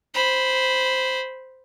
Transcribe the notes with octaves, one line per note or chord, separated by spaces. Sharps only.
C5 B5